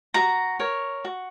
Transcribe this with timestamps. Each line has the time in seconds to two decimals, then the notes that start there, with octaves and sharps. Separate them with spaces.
0.14 F#4 A#5
0.59 A#4 C#5
1.05 F#4